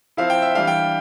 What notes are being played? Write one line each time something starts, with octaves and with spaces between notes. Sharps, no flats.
F3 C4 E4 F5
G5
E5
E3 G3 D4 F5
G5